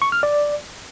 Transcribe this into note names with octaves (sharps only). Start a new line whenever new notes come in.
C#6
F6
D5